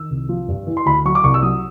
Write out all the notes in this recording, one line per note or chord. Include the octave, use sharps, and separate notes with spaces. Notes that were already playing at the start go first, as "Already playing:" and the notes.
Already playing: D#3 E6
C2
F3
G2
E3
C6
D2 B5
F#3 C#6
D6
C2 C#6
E6
F#3 D#6